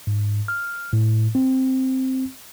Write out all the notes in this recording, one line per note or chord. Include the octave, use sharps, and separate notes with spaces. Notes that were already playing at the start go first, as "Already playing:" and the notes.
G#2
F6
A2
C4